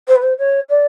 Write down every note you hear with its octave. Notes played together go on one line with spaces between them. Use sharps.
C5
B4
C5
C#5
D5